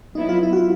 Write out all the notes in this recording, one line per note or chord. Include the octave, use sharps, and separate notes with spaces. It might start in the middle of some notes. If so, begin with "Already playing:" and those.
F#3 B3 D#4 E4
F4
E4
F#4
F4